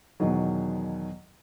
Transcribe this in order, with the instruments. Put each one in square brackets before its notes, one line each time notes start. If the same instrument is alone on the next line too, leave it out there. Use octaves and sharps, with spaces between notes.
[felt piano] E2 B2 D#3 F#3